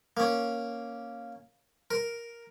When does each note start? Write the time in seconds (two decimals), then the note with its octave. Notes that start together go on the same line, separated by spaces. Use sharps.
0.17 A#3 C#4
1.91 A#4